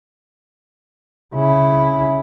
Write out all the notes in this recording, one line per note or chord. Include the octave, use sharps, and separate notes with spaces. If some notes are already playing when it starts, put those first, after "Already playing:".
C#3 E4